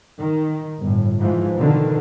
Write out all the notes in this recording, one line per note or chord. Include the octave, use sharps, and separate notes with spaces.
D#3
G1 A2
G#2 E3 F3
B2 D3 D#3